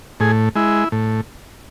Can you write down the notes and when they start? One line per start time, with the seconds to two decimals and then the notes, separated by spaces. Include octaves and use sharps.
0.20 A2 G#4
0.55 G#3 E4
0.92 A2